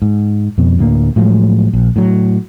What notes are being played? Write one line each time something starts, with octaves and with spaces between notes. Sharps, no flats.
G#2
F2 B2
D2 A2 A#3
A2 F3 F#3 G#3
A#1
A2 F#3